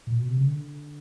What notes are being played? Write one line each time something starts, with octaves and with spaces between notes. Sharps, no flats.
A#2
B2
C3
C#3
D3